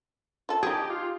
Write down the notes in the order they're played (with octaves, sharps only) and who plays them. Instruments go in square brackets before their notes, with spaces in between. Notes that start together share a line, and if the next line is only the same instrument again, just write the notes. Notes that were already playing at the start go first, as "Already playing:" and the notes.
[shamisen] F4 A4
[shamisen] D#4 G#4 [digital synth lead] G4
[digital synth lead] F4